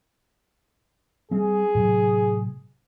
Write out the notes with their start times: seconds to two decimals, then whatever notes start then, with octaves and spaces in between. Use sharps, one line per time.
1.31 G3 C4 G#4
1.75 A2 C3 F#3